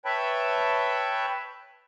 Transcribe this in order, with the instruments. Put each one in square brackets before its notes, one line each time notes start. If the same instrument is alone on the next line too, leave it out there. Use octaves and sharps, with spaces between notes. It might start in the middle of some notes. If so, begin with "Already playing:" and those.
[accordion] B4 C#5 E5 G5 A5 B5